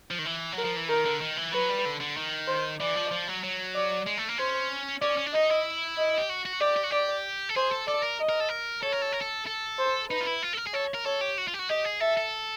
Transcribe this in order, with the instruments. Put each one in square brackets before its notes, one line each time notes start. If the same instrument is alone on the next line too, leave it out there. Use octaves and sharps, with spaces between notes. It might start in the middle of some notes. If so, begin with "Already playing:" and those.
[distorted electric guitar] F3
D#3
E3
F#3
[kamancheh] A#4
[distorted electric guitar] F3
E3
[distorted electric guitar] D#3 [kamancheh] A#4
[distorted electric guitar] D3
D#3
E3
[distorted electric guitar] F#3 [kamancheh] B4
[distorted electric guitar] G3
D3
D3
D#3
[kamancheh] C5
[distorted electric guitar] E3 [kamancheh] D5
[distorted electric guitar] F3
F3
F#3
F#3
[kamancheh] D5
[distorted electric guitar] G#3
A3
A#3
[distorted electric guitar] C#4 [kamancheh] C5
[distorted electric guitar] C#4 [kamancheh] D5
[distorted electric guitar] C#4
D4
[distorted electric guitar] D#4 [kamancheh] D#5
[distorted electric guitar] E4
[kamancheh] D#5
[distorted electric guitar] G4
F#4
F#4
[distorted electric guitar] G4 [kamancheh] D5
[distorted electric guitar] G4
F#4
[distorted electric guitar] G4 [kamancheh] D5
[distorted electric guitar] A4
[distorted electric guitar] G#4 [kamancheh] C5
[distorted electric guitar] A4
[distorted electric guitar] A4 [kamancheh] D5
[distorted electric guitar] A#4
[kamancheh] D#5
[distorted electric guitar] A#4
A4
A#4
[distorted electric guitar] A4 [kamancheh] C#5
[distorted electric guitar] A#4
A4
A#4
A4
A4
[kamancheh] C5
[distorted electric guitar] D#4 [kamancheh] B4
[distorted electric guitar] F4
E4
F4
A4
A#4
G#4
[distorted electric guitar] A4 [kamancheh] C#5
[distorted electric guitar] A#4
[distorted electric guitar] A4 [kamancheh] C#5
[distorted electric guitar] G4
F#4
F4
G4
F#4
[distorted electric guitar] G4 [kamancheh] D#5
[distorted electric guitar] G#4
[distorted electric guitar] A4 [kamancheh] E5
[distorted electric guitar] A4